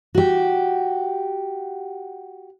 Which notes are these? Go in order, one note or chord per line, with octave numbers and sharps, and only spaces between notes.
F#4 G4